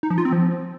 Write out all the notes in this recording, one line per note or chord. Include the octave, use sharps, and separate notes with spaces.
D#4
F3
F4
C4
F3